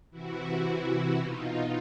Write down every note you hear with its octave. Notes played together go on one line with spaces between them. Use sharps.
C3 E3 E4 F#4
B2 D#4 F4